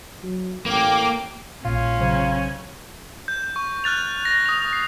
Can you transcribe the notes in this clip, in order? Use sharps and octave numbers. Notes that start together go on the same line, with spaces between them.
F#3
A1 A#3 G5 D6
A#1 A#2 C#4 F4
A#1 C#3 F#3 C5
G6
C#6
F6 F#6 A6 F7
A#6
D#6 F7
C7